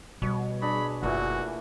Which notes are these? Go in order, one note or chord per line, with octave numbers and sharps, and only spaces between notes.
B2 G3 C#5
D4 G#4 C#5 B5
F#1 A#2 E3 A3 F#4